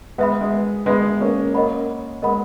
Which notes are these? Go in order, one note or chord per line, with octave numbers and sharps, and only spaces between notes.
G#3 B3 B4 E5 B5
G#3
G#3 B3 B4 E5 B5
A#3 C#4
A#3 C#4 A#4 D#5 F#5 B5
G#3 B3 A#4 D#5 F#5 B5